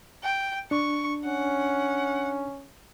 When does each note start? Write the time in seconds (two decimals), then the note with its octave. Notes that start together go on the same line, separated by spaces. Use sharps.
0.23 G5
0.71 D4 C#6
1.25 C#4 F#5